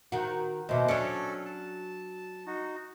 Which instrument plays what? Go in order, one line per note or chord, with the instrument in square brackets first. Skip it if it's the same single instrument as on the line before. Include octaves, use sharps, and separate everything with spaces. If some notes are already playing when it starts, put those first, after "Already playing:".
[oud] D#3 F#4
[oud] D#2 B2 [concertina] C5 [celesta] D#5 E5 D6
[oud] F#3 D4 [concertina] C#4 A4 [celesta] C#7
[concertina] A5
D#4 F#4